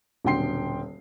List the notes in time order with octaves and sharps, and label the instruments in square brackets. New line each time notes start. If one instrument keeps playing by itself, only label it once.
[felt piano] D#1 B1 D3 G5 C6 C7